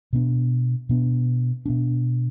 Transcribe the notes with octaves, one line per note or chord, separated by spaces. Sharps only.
B2 B3 D4
B2 B3 D4
B2 B3 D4